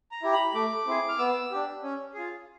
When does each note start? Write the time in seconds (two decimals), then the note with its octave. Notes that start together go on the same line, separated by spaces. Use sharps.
0.12 A#5
0.23 E4 G4
0.33 B5
0.54 A3 D6
0.86 C4 E4 G#4
1.09 F6
1.18 B3 E6
1.51 D4 G4
1.83 C#4
2.14 F4 G#4